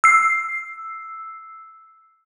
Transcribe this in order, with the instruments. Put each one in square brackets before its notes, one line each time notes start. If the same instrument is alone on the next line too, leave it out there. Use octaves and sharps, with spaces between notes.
[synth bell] E6 C7